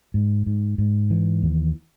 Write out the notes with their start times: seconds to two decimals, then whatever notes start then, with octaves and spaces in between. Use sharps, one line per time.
0.14 G#2
0.46 G#2
0.78 G#2
1.10 E3
1.42 D#2